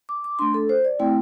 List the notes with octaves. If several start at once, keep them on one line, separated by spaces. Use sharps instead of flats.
D6
D6
A3 D4 C6
A4
C5
D5
A3 C4 E4 G5